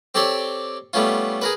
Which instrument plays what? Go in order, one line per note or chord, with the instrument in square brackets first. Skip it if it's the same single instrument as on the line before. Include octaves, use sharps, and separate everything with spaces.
[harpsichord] C4 G4 A4 C#5 D5 C6
G3 A3 B3 C#4 F4
G#4 A#4 B4